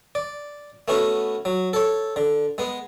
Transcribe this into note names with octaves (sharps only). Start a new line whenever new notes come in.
D5
A3 B3 C#4 F#4
F#3
A4 C#5
D3
G#3 B3